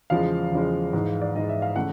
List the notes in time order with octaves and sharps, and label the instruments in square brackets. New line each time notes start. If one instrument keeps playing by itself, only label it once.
[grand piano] E2 C#3 F3 G#3 F5
E2 C#3 F3 G#3
G#2 E3 G#3
D5
G#2 E3 G#3 D#5
E5
F5
C#3 E3 A3 F#5